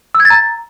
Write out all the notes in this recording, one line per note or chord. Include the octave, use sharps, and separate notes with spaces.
E6
G#6
A6
A#5